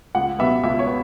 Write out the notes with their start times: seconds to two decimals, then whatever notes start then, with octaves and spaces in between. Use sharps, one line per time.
0.15 C#2 F#5
0.39 B2 B3 E5
0.64 C#2 E5
0.79 C#5
0.87 B3